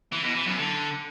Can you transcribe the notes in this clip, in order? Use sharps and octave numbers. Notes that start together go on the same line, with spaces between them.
E3
B2
E3
F#2
D3